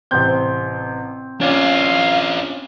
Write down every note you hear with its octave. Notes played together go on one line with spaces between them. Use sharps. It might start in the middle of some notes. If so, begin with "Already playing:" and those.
A1 C3 C4 G6
C#4 D4 F4 D5 F5